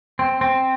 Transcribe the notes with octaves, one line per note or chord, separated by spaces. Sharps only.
C4
C4